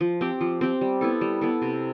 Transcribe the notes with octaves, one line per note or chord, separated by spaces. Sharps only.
F3
C4 G4
F3
C4 G4
G3
B3 E4 A4
G3
B3 E4 A4
C3